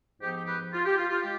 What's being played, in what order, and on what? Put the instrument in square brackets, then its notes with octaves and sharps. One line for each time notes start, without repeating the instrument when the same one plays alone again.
[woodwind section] G#2 F3 B3 D#4 G4
G4
G4 B4
F4
G4
F4
F4
G#3 G4